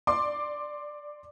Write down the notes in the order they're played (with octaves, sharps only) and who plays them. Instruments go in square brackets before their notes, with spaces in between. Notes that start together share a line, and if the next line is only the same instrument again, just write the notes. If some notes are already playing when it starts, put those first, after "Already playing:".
[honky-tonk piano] D5 C6 D6